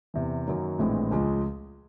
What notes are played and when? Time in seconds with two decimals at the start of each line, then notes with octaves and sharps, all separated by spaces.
0.14 E2 C3 E3
0.47 F#2 D#3 F#3 A#3
0.79 A#1 A2 E3 G#3 C4
1.11 C#2 C#3 F3 G#3